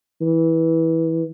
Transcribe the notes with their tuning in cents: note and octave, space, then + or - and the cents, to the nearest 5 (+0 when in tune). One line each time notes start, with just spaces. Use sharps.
E3 -15